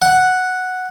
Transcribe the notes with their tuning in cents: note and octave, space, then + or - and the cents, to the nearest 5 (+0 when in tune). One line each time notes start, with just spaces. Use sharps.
F#5 -5